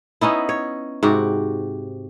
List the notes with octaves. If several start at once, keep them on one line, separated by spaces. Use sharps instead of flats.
B3 C#4 D#4 E4
C#5
G#2 C3 F#4 G4